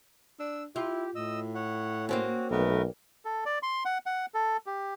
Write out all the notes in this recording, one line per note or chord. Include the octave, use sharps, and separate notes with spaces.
D4 E6
E4 F4 G4
A2 D#5 E6
C#5 F#5
A#3 C4 C#4 F#4
B1 A3 B3 A#4 B4
A4
D5
C6
F#5
F#5
A4
G4